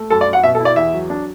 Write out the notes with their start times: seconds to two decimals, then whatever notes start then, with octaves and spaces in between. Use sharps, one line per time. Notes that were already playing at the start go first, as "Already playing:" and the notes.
Already playing: A3
0.10 F#2 A4
0.21 D5
0.27 F#2
0.33 F#5
0.43 B2 E5
0.55 A4
0.60 E4
0.65 D5
0.76 E2 E5
0.93 F#3
1.10 D4